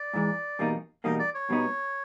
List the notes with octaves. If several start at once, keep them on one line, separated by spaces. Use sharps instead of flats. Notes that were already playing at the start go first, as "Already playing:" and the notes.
Already playing: D5
G#2 E3 G#3
E2 B2 G3 A#3 D#4
E2 B2 G3 A#3 D#4 D#5
D5
C#5
B2 G3 B3 D#4